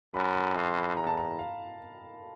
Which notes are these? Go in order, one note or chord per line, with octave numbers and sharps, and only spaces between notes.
F#2 B5
B5
F2 C6
B5
E2 A#5
A5
A#5
F5